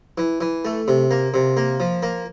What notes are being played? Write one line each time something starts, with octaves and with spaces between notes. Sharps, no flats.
E3
E3
A3
C3
A#3
C3
A#3
F3
A#3